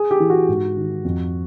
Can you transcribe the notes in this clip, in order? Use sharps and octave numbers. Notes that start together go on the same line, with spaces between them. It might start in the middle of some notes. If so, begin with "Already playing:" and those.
Already playing: G#4
G4
E3
F#4
G#2
D#3
F2